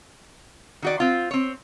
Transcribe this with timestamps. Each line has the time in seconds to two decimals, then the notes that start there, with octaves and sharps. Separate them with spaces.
0.82 D#3 F#4 D5
1.00 C4 F4
1.31 C4 C#5